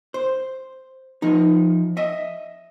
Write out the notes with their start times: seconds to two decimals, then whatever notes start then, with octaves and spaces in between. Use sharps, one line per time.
0.14 C5
1.22 F3 D#4
1.97 D#5 E5